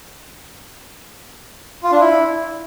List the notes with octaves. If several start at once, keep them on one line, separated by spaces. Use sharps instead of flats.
F4
D4
E4